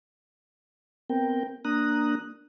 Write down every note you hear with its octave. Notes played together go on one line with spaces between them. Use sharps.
B3 C4 A#4 G5
A#3 D4 A#5 D#6 F#6